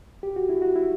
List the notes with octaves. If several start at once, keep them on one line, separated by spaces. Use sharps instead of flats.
G4
F#4
E4
F#4
E4